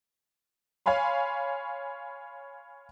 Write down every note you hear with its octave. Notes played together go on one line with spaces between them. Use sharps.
C#5 F5 G#5 B5 C6